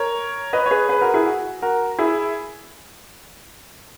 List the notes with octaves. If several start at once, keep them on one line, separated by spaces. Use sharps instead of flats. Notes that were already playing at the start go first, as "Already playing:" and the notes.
Already playing: A#4 C#5
B4 D#5
C#5
G#4 B4
G#4 B4
F#4 A#4
E4 G#4
F#4
F#4 A#4
E4 G#4